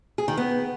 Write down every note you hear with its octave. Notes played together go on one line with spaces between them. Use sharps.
G#4
D#3
B3